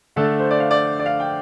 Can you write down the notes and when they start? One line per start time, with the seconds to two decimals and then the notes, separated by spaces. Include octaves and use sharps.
0.16 D3 A3 D4 A4
0.39 C5
0.51 D5
0.60 F5
0.71 D5
0.99 D5
1.06 F5
1.20 G5